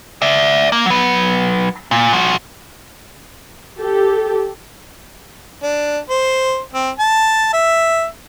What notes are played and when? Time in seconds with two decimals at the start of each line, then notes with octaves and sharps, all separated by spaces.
0.22 D5 E5
0.72 A#3
0.86 F#3 B4
1.91 A#2
2.13 F3 F#4
3.77 G4 A4
5.63 D4
6.10 C5
6.73 C4
6.99 A5
7.53 E5